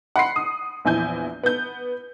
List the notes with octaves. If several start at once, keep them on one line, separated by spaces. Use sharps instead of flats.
F#5 B5 C6 C7
D#6
A#1 E2 E4 G#5 G6
B3 G6